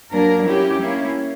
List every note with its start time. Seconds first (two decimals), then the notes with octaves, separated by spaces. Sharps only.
0.12 F#3 A#3 D4 A#4
0.45 F#3 C#4 E4 G4
0.79 A#3 C#4 E4